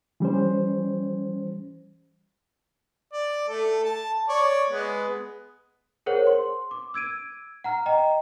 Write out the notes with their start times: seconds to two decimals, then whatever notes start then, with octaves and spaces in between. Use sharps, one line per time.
0.20 E3 G3 C#4 C5
3.13 D5
3.49 A3 A4
3.84 A5
4.29 C#5 D5
4.70 G#3 B3
6.06 G#4 A#4 C5 C#5 F#5
6.27 C6
6.71 D6
6.94 E6 G#6 D7 D#7
7.64 F#5 A#5 F6
7.86 D#5 G5 A#5